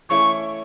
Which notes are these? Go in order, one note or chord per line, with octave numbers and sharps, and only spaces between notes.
E3 A3 C#4 E4 C#6